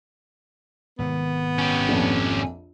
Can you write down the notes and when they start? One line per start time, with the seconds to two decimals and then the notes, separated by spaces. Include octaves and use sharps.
0.99 G#1 C3 D#3 B3
1.58 C#4 G4
1.89 A#1 F2